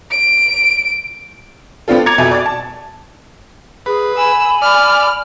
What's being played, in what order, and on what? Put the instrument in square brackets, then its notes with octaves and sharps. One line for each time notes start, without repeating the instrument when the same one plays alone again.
[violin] D7
[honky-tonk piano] B3 C4 D4 F4 A4
A#5 D6 G#6 A6 C#7 F7
F2 B2 E5 G#5
D5 D6 A6
A5
[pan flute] G#4 [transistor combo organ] B4
[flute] G#5 [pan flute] B5 [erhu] E6
[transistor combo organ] D5 [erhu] F6